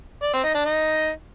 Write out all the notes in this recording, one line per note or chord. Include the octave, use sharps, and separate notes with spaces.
D5
C4
D#4
D4
D#4